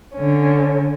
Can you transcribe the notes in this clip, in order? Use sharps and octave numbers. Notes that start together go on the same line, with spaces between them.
D3 C#4